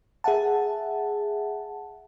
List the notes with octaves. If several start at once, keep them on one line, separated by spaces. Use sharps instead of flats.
G#4 E5 F#5 A5